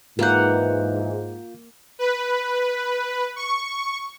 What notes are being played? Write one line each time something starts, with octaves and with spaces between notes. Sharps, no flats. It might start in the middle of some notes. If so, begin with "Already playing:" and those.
G#2 E3 A#3 F4 B4 F5 F#5 G6
B4
C#6